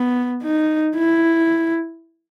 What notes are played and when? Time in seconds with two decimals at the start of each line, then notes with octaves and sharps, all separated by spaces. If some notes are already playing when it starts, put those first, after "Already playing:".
Already playing: B3
0.43 D#4
0.96 E4